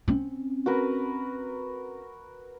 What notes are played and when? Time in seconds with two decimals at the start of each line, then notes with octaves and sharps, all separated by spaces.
0.08 C4 C#4
0.66 F#4 A#4 B4